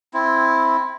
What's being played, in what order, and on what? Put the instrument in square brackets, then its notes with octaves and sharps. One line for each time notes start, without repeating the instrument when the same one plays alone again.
[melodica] C4 E4